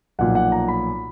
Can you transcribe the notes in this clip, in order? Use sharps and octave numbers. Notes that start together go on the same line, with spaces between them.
B1 A#2 F3 F#5
F#5
A#5
B5